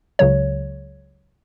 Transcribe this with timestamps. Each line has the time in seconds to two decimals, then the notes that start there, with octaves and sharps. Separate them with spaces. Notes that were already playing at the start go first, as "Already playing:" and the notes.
0.19 C#2 C#3 F#3 C#5